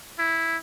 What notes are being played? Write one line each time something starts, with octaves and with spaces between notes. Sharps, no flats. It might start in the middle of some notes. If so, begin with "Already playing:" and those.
E4